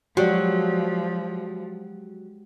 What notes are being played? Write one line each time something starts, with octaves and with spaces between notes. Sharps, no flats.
F3 F#3 G#3 F#4 G4 D5